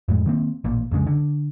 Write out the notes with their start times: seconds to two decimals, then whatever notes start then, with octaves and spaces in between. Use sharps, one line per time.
0.08 F2 A2 G#3
0.26 D#3 A#3 C4
0.64 A1 A#2
0.91 C2 F2 C#3 G#3
1.06 D3